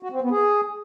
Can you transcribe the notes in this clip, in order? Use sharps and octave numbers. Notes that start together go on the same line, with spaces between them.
F#4
C4
B3
G#4